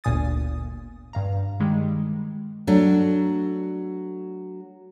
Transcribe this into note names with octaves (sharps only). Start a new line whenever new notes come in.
G1 D2 A#2 G#5 D#6 A6
G2 F5 A#5
D#3 G3 G#3
F#3 A3 D4